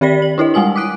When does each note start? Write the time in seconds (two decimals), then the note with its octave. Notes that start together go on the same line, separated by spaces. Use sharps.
0.01 D#3 G4 A#4 D5 A#6 B6
0.22 F#7
0.38 D4 E4 A#4 D#5
0.54 G3 G#3 G#5 D#6 F#7
0.76 D6 D#6 F#6 D7